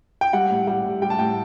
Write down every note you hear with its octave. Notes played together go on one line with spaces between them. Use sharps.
G5
G3 F#5
A2
G3 F#5
A2
G3 G5
A5
A2 G5